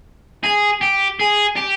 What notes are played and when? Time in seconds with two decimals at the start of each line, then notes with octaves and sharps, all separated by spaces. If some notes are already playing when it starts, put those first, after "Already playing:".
0.44 G#4
0.81 G4
1.19 G#4
1.56 G4